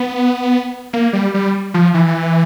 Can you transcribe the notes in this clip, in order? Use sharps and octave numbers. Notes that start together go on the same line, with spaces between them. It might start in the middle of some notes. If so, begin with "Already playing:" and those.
Already playing: B3
A#3
G3
G3
F3
E3